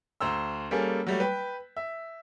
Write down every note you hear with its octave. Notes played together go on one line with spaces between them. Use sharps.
D2 C5 A#5 E6
G3 A#3 C#4 G#4 A4
F#3 G3 A3
B4 G5
E5